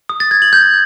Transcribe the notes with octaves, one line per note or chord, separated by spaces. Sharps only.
D#6
A6
G#6
F#7
G6